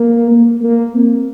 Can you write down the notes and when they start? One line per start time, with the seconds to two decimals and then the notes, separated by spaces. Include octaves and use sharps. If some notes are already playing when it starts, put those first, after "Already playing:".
Already playing: A#3
0.31 A#3
0.63 A#3
0.95 C4